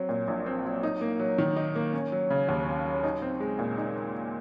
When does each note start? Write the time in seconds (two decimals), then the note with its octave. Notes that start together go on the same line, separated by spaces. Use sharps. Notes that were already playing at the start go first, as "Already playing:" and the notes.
Already playing: F#3 C4
0.09 A#2
0.28 A#1
0.46 C4
0.65 F#3
0.83 D#4
1.01 A#3
1.20 F#3
1.38 D#3
1.56 D#4
1.76 A#3
1.93 C#4
2.12 F#3
2.30 C#3
2.49 D#2
2.67 C#4
2.86 F#3
3.04 D#4
3.22 C4
3.40 G#3
3.59 A#2
3.78 D#4